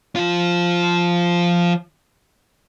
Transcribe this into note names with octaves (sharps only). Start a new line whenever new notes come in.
F3 F4